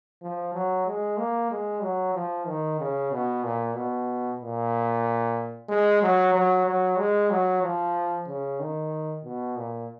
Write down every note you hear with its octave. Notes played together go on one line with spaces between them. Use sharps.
F3
F#3
G#3
A#3
G#3
F#3
F3
D#3
C#3
B2
A#2
B2
A#2
G#3
F#3
F#3
F#3
G#3
F#3
F3
C#3
D#3
B2
A#2